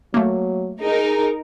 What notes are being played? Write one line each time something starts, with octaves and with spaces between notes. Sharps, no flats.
F#3 A3 A#3
D#4 G#4 A#4